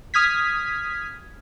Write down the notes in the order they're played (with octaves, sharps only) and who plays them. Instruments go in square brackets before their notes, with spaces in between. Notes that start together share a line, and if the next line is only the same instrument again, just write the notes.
[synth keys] D#6 F6 G#6 B6